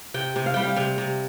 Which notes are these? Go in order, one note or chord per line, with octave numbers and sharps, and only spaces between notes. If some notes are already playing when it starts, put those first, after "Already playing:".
C3 G5
C3
F5
G3 G5
F5
C3 F5
C3